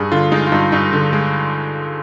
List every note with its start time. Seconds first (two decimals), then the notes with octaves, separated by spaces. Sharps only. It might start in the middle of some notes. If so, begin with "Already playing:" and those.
Already playing: G2 G#4
0.12 D3 F4
0.32 G#3 D#4
0.47 F4
0.52 G2 D#4
0.72 G2 D#4
0.93 D3
1.13 G#3